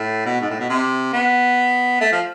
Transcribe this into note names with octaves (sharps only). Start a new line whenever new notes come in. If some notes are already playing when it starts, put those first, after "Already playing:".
Already playing: A2
B2
G#2
A2
B2
C3
B3
A3
F3